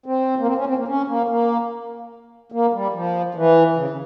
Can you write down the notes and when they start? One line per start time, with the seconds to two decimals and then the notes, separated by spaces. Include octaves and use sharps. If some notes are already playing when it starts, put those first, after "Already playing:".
0.06 C4
0.39 A#3
0.47 C4
0.58 C#4
0.67 C4
0.77 A#3
0.88 C#4
1.08 A#3
1.29 A#3
2.52 A#3
2.73 G3
2.93 F3
3.35 E3
3.76 C#3
3.90 C#3